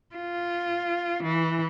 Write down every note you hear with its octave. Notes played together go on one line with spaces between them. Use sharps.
F4
E3